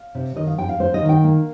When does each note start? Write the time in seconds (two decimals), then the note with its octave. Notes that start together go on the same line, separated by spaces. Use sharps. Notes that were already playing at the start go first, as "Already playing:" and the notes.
Already playing: F5
0.15 C3
0.36 D#3 D#5
0.47 F5
0.58 F2 G5
0.69 F5
0.80 A#3 C5
0.94 D#5
1.02 D#3
1.09 G5
1.24 A#3